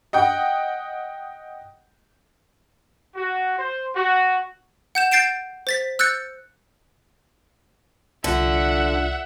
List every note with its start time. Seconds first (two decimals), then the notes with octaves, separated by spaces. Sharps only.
0.13 D#5 F#5 G5
3.14 F#4
3.58 C5
3.94 F#4
4.95 F#5 G6 E7
5.12 G6 A6 C7 D7 E7
5.67 C5 A6 B6
5.99 E6 F#6 G6 A6 C#7
8.24 C2 D3 F4 E5 F#5